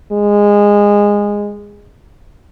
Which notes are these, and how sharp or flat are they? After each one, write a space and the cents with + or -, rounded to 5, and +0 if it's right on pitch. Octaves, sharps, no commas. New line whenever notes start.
G#3 -20